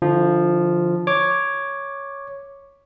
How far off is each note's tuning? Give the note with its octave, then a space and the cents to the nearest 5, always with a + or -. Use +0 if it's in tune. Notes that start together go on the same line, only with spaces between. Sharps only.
D3 +20 F3 +0 E4 -40
C#5 +0 D6 +0